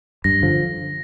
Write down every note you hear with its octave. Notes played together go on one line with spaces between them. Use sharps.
G2 A#6
D3 F3